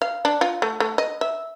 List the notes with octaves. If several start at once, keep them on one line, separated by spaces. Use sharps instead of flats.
F5
D4
F4
A3
A3
D#5
E5